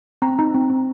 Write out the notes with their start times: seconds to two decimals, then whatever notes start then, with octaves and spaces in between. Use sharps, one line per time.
0.22 C4 A#5
0.39 D#4
0.55 C4
0.70 C4